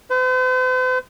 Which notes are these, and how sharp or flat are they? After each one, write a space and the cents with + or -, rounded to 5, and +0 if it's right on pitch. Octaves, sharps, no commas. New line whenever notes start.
C5 -45